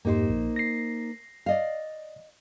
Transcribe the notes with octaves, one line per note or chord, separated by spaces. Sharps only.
F2 G#2 A#3 D#4 G4 C5
A#1
A#6 C7
D5 D#5 F5